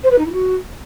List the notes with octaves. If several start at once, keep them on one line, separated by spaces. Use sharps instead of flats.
C5
B4
D#4
E4
F#4